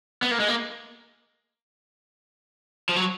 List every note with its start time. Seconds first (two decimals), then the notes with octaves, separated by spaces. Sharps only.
0.22 B3
0.31 A#3
0.40 G#3
0.48 A#3
2.89 F3
2.96 F#3